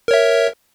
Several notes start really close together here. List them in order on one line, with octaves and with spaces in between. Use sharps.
A#4 C#5 E5